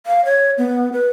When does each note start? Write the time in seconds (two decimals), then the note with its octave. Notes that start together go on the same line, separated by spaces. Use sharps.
0.06 F5
0.25 C#5
0.58 B3
0.93 B4